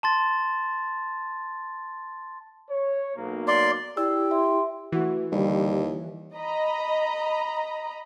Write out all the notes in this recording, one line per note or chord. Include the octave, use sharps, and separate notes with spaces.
A5 C6 A6
C#5
B1 A#3
D5 C6
E4 G4 D5 E6
E5 C6
E3 A3 F#4
D#2 D3 G3
D#5 A#5 B5